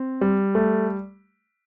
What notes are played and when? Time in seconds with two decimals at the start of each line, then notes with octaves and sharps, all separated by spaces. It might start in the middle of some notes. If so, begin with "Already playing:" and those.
Already playing: C4
0.21 G3
0.55 A3